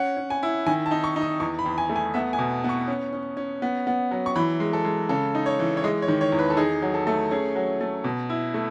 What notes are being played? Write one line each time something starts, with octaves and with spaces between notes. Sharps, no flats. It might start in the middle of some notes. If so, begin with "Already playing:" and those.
Already playing: C#4 F#5
C#4
G#5
E4
D#3 G#5
A5
D#4
C#6
D#4
D#6
E2 C#6
B5
E2
G#5
A3
G#5
B3 E5
G#5
B2
B3 C#6
C#4
C#4
C#4
B3
B3
F#3
C#6
E3 B5
G#3
A4
G#3
C#3 A4
D#4
C#5
E3
C#5
G#3 D#5
C#5
D#3
C#5
E2
B4
A4
D#4 G#4
F#3
A4
A3
C#4 G#4
F#3
A3
B2
E4
A3